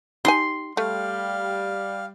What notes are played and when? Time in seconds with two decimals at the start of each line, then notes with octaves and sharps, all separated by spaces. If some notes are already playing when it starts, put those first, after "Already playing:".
0.25 D#4 G4 G#5 C6
0.77 G3 A3 F5